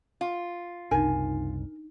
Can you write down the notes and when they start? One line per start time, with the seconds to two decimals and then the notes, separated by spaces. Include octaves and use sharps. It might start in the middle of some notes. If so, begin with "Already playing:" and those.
0.21 F4
0.91 F#1 C2 D4 D#4 A#4 G#5